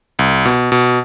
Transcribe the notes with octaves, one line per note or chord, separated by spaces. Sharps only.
C2
B2
B2